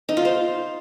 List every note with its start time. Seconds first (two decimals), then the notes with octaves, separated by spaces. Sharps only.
0.09 D#4
0.17 F4
0.25 C5